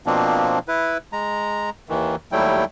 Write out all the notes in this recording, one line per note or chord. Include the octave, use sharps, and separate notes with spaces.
B2 F3 A#3 C4 D4
E4 B4
G#3 A#5
D#2 D#3 E3
D#2 F#3 G3 A3 E4 G5